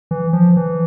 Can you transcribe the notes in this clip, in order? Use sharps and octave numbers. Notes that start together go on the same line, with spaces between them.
E3
F3
E3